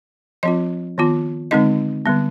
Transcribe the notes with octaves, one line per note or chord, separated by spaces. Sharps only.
F3 C4 F4 D#5
D#3 B3 F4
D3 G#3 C4 D#4 D#5
D3 G3 B3